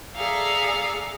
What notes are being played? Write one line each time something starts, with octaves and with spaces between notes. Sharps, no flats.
G#4 A4 D5 E5 F5 A#5